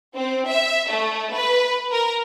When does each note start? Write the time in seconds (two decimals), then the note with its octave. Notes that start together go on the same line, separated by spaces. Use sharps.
0.15 C4
0.48 E5
0.90 A3
1.34 B4
1.92 A#4